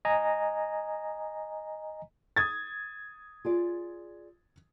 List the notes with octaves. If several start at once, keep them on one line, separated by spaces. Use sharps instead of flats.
D#5 G#5 A#5
D#6 G#6 A6
F4 G#4 D5